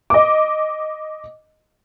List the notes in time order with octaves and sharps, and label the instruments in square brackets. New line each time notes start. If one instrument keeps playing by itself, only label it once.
[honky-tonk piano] D#5 D6